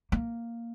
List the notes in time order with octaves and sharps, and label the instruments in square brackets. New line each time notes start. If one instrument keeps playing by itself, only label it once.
[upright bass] A#3